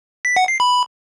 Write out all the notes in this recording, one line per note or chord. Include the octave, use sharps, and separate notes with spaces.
B6
F#5
C7
B5